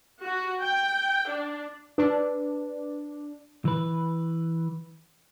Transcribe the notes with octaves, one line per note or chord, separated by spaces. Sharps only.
F#4
G5
D4
D4 B4
E3 B4